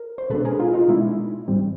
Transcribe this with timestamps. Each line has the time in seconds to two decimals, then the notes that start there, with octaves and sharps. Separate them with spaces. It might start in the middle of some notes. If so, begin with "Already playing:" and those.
Already playing: A#4
0.18 C5
0.30 B2 G#3 B3 D4 A4 B4
0.45 G#4 A#4
0.59 D#4 F4
0.74 D#4 F4
0.88 B2 G#3 B3 D4 E4
1.48 G#2 E3 G3 C4